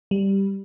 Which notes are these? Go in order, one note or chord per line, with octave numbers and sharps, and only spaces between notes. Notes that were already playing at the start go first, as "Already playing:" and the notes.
G3